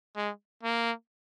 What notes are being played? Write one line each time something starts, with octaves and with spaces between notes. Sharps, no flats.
G#3
A#3